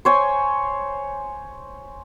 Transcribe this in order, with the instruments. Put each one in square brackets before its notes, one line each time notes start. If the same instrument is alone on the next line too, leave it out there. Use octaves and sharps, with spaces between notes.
[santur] C5 C#5 G#5